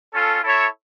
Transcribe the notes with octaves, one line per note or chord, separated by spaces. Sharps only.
C#4 F4 A4
E4 A4 C#5 E5